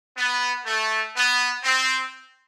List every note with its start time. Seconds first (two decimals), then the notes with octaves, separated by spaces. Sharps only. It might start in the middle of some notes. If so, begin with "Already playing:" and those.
0.17 B3
0.65 A3
1.15 B3
1.63 C4